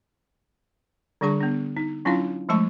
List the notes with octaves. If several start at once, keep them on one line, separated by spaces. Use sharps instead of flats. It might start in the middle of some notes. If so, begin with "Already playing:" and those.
D3 G3 D4 G#4 C#6
B3 D4
D#4
F#3 C#4 D4 E4 F4 F5
F3 G#3 A3 A5 C#6